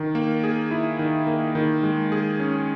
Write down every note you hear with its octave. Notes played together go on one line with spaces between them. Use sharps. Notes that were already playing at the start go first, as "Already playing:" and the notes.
Already playing: D#3
A#3
G#4
E4
D#3
A#3
D#3
G#3
G#4
C#4